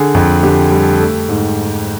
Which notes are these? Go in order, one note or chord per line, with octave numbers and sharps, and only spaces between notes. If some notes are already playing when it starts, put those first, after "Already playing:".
Already playing: D3 G#4
F2
D3 G4
G3
A3
G#2